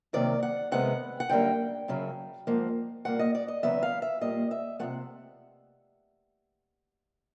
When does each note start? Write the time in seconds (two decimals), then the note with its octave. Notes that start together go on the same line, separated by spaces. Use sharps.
0.13 C3 D#3 F#3 A#3 D5
0.43 F#5
0.71 C3 D#3 G#3 B3 F#5
1.20 F#5
1.29 F#2 D3 G3 A#3 G5
1.88 F#2 C#3 F#3
2.47 G#2 F3 A#3
3.05 A#2 G3 A#3 F#5
3.19 D#5
3.35 D5
3.48 D#5
3.63 E2 C#3 F#3 B3 E5
3.83 F5
4.02 E5
4.21 A#2 G3 A#3 D#5
4.51 E5
4.79 C3 F3 A3 F#5